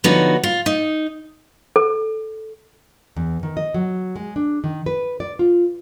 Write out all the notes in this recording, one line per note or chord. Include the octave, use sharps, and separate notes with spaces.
D3 F3 B3 D#4 F#4 C#5
F4
D#4
A4
E2
D#3
D#5
F#3
G#3
D4
D#3
B4
D5
F4